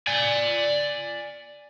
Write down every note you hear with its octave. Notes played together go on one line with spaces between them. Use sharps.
D5 G#5